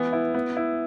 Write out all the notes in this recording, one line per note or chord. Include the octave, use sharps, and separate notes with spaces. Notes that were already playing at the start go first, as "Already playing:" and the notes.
Already playing: E3 B3
E4
B3
E4